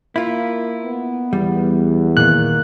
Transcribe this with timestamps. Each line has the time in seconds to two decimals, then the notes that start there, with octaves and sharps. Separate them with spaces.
0.16 A#3 E4 F4
0.85 B3
1.33 E2 G3
2.17 A#2 D#3 A#3 F#6